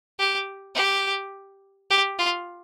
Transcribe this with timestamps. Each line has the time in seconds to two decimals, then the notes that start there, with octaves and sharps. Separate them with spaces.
0.19 G4
0.75 G4
1.90 G4
2.19 F4